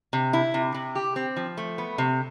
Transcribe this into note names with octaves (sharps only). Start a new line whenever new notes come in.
C3
E4
C3
C3
G4
C4
F3
A3
B3
C3